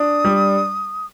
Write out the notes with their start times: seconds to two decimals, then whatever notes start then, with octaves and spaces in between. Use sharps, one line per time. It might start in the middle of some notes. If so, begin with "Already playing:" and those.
Already playing: D4 D#6
0.25 G3